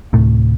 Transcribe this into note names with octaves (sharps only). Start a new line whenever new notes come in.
D2 A2 C3 A3